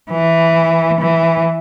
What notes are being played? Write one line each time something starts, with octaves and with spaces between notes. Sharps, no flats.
E3
E3